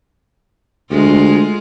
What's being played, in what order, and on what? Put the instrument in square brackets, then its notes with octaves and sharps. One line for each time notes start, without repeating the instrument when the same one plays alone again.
[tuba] D2 [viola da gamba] G#3 F4